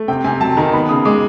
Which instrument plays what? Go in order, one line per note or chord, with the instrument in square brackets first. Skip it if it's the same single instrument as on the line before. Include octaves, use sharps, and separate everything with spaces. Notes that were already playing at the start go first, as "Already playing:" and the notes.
Already playing: [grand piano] A3
[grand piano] C3 [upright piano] G5
[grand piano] C3 [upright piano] G#5
[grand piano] F#3 [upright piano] A5
[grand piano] D#3 [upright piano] A#5
[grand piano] B3 [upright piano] B5
[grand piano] C#3 [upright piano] D#6
[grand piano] G#3 [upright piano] D6